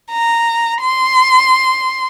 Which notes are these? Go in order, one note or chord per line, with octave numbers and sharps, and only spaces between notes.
A#5
C6